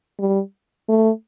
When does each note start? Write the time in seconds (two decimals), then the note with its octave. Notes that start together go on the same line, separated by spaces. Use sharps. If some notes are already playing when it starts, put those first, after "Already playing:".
0.19 G3
0.89 A3